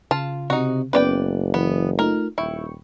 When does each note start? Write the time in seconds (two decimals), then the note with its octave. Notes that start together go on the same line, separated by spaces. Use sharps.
0.11 C#3 F4 A5
0.50 C3 D#4 F#4
0.93 F#1 B3 C#4 B4 D5 G5
1.54 E3 B3
1.99 A3 D#4 F4 A#4
2.38 D#1 E4 G5 C#6